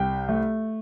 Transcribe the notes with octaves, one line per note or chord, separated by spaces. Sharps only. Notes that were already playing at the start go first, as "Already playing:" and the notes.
Already playing: C2 G5
A3